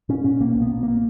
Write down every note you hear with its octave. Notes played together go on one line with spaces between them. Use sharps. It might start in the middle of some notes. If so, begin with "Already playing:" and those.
A#2 C#4
A#2 C#4
B1 A#3
B1
B3
A#2
A#2 A#3